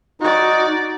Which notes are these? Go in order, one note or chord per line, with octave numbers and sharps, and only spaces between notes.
D#4 F#4 D5